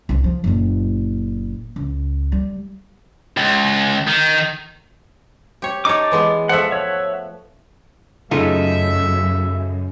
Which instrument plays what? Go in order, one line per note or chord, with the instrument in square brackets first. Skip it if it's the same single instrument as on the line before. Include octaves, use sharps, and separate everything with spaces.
[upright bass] C2 C#3
F3
F#1 A#2
C#2
G3
[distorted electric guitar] C#2
D#3
[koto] G4 C#5
[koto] D#4 C#5 [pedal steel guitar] A5 D6
[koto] E3 G#3 B3
[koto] F3 A3 [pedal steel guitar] E5 F#5
[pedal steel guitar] C#5 E5 F#5
[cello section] F#2 [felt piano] C#3 [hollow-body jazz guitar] A3 D#4 F4 [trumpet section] E5